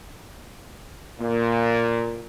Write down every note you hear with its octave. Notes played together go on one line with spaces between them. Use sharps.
A#2